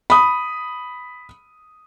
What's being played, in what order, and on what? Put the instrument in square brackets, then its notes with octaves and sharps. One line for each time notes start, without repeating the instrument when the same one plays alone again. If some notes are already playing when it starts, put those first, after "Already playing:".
[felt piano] B5 D#6